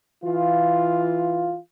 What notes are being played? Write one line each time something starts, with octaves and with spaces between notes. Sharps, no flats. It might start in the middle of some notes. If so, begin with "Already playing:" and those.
E3 F4